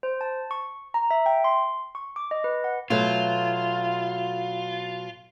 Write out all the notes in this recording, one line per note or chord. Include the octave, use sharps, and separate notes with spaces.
C5
A5
C#6
A#5
E5
G5
C6
C#6
D6
D#5
B4
F#5
B2 F#3 A3 F4